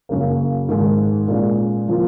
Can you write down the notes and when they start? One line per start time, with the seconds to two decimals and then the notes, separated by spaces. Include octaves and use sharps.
0.09 F#2 C#3 F#3 A#3
0.69 G#2 D#3 G#3
1.28 A#2 G#3 C#4
1.88 F3 A#3